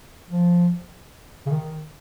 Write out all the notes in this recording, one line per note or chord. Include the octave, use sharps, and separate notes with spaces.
F3
C#3
D#3